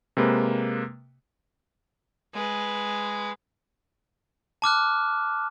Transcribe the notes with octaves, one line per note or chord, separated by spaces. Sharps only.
C3 G#3 A#3 B4
G#3 B4
A5 D6 F6 F#6